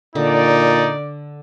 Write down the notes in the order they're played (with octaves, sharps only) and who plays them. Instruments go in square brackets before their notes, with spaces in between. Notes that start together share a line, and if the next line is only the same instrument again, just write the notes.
[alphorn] A#2 [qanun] D3 [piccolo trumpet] D#4 [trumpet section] D5